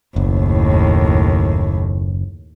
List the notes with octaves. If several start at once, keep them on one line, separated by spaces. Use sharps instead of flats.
F#1 D#2 A2